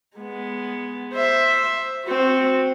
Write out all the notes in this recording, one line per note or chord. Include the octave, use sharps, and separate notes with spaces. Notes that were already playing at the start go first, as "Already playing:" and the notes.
G#3 B3
C5 E5
C4 F#4